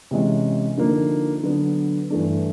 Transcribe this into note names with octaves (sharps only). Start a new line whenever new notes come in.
C3 E3 G#3 C#4
D3 F3 A#3 D#4
D3 F#3 B3
G2 E3 A3 D4